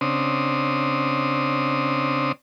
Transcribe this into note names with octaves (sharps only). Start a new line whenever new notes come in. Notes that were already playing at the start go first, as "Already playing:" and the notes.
C#3 C4 D4 D#6